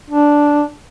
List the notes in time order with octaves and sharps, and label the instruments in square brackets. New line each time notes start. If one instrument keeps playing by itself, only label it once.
[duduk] D4